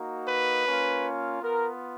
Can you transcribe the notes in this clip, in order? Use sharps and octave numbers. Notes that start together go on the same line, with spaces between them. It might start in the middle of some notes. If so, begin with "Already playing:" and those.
Already playing: A#3 D#4 F#4
B4
A#3 C#4 F4
B3 F4 A#4